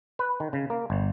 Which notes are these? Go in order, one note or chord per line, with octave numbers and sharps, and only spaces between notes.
B4
D#3
C#3
A#3
G1